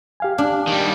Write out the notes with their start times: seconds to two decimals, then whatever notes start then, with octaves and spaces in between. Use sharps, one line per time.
0.20 G4 F5 G#5
0.38 D4
0.67 D#3 G3